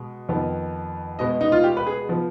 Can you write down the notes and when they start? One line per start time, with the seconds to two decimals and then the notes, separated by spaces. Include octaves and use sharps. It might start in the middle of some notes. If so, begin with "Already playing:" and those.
Already playing: B2 G#3
0.29 F2 D#3 B3
1.19 B2 G#3 B3 D#5
1.41 D#4
1.52 F4
1.64 G4
1.77 B4
1.87 G#4
2.09 F3 B3